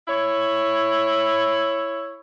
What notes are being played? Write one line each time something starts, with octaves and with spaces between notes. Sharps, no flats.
E4 C#5